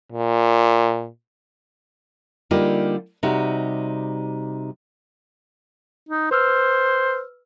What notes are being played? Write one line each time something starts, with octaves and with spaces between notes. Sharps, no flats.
A#2
D3 G3 A#3 D#4 F4 G4
C3 G3 D#4 F#4 G4
D#4
B4 C5 E6 F6